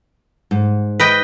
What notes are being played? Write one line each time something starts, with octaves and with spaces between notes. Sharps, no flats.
G#2
B4 D#5 G5